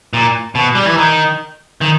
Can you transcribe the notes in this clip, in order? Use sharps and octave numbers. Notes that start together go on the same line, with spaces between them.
A#2
B2
G3
E3
D#3
D#3